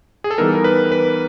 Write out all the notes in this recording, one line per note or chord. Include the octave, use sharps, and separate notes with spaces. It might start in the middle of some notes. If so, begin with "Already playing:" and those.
G#4
A4
E3 G3 B3 D#4 A#4
A#4
B4
B4